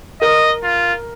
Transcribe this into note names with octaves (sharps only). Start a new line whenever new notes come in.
A#4 D#5
F4